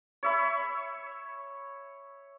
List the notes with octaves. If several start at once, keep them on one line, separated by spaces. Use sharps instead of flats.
C#5 E5 B5